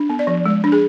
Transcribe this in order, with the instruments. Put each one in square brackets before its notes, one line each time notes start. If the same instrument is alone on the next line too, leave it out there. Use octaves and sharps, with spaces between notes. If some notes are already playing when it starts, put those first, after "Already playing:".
Already playing: [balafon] D4
B3
D5
F3
G#3
D4
G#4